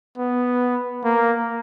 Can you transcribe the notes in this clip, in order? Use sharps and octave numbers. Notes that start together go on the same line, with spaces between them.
B3
A#3